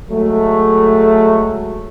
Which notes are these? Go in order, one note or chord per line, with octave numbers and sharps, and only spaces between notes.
F#3 G#3 A3